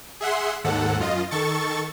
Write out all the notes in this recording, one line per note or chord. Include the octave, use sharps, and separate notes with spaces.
G#4 E5 F#5 C6
D#2 G#2 A4 F#5
F#2 F4 D#5
D#3 A4 C#6 A6